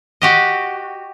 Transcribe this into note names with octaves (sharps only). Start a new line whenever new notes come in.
F#4 G4 D#5